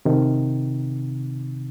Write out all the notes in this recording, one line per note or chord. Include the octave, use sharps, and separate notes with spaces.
C3 D#3